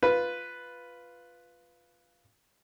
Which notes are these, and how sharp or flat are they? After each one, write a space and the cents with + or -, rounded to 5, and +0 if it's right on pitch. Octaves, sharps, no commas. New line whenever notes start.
F4 +0 B4 +0